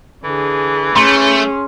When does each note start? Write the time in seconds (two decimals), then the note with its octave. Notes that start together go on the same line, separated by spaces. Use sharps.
0.24 D3 E3 G#4
0.96 A3 C#4 G#4 C6